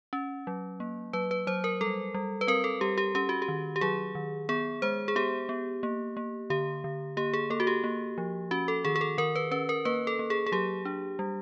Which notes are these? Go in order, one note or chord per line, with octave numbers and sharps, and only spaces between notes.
C#4
F#3
A#3
F#3 B4
B4
F#3 C5
A#4
G3 A4
G3
B4
C4 A#4
A4
G3 G4
G4
C#4 G4
F#4
G4
D#3
G4
F#3 G#4
D#3
B3 G#4
G#3 C5
G#4
B3 G4
B3
A#3
A#3
D3 G4
D3
A#3 G4
G#4
A#3 A4
F#4
G4
A#3
F3
C#4 F#4
A4
D#3 G#4
G#4
A4
D#3 A#4
B4
C#4 B4
A#4
A#3 B4
A4
A#3
G#4
G#4
F#3 G4
D4
G3